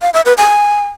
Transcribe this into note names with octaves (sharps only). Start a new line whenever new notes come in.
F5
E5
B4
G#5